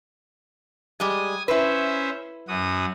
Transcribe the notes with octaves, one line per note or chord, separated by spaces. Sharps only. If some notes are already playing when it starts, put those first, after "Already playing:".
G3 G#3 G#5 D#6
C#4 E4 B4 C5 E5
F#2 F#4 D#6